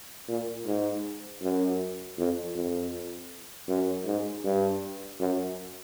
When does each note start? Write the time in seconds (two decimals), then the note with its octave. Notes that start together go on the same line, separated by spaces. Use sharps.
0.28 A#2
0.67 G#2
1.42 F#2
2.18 F2
2.55 F2
3.68 F#2
4.06 G#2
4.44 G2
5.20 F#2